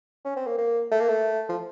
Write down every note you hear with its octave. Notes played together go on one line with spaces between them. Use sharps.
C#4
C4
A#3
A#3
A3
A#3
A3
F3